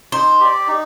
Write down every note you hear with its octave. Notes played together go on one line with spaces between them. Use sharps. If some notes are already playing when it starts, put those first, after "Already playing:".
D#4 C5
G4 D5
D#4